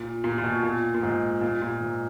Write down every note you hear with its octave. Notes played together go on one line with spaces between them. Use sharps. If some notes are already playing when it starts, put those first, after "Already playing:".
Already playing: A#2
A#2
A#2
B2
A#2
A#2
G#2
A#2
A#2
G#2